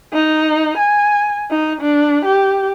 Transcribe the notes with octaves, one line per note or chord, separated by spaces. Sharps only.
D#4
G#5
D#4
D4
G4